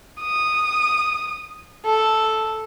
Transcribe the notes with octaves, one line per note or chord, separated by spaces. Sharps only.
D#6
A4